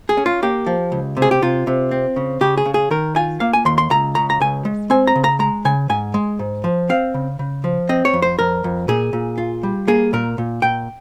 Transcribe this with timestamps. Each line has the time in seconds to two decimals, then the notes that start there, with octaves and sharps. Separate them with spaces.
0.09 G#4
0.17 C#4
0.26 F4
0.42 A#3 G4
0.66 F3
0.92 C#2
1.17 C3
1.22 G#4
1.31 G4
1.42 C3 F4
1.67 C3
1.91 C4
2.16 C#3
2.41 C#3 G4
2.57 G#4
2.66 C#3
2.74 G#4
2.91 D#3 A#4
3.16 F4 G#5
3.40 A#3 F5
3.53 G#5
3.65 D#2 C6
3.78 C6
3.90 C#2 A#5
4.15 C#3 A#5
4.30 A#5
4.40 C#2 G#5
4.65 G#3
4.90 C4 G#5
5.07 A#5
5.16 C#3
5.24 A#5
5.39 G#3 A#5
5.65 C#3 G#5
5.89 G#2 G#5
6.14 G#3
6.39 G#2
6.64 F3
6.89 C4 F5
7.14 C#3
7.39 C#3
7.64 F3
7.89 C4 D#5
8.05 C#5
8.13 F2
8.22 C5
8.39 F2 A#4
8.64 F2
8.88 A#2 G#4
9.13 A#2
9.38 F4
9.63 G3
9.88 A#3 G#4
10.13 A#2 A#4
10.38 A#2
10.62 A#2 G5